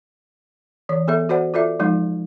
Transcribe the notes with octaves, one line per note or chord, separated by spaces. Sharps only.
E3 C#5
B3 G#4 A4 E5
F#4 C5 D5 F#5
F4 A4 D5 E5
F3 G#3 D#4